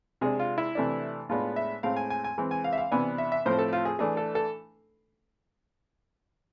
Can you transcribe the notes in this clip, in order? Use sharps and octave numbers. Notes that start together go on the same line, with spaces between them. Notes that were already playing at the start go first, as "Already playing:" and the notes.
C3 G#3 D4 G#4
F4
E4
C3 E3 A3 D4
A2 G#3 B3 D4 F4
E5
A2 G#3 C4 F5
G#5
G#5
G#5
E3 G#3 C4
G#5
F5
E5
F5
C3 E3 B3 D4 G#5
E5
E5
A2 F3 A3 C4 C5
A4
F4
G#4
E3 A3 D4 G#4
A4
A4